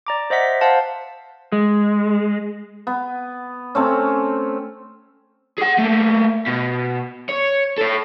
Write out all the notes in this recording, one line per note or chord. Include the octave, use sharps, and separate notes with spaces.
D5 A#5 D6
C5 D#5 E5 F#5 B6
C5 F5 F#5 A5
G#3
B3
A3 C4 C#4
G#4 F#5
A3 A#3
B2
C#5
A4 C#5